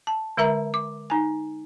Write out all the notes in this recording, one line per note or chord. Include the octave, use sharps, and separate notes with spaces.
A5
D3 G#3 A#4 E5 A#5
D6
D#4 G#5